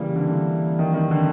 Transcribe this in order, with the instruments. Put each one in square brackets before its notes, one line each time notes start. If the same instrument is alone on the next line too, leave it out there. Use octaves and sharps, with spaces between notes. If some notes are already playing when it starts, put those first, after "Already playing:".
Already playing: [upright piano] C#3 [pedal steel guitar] E3 G3 A#3
[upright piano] D3
D#3
D#3
D3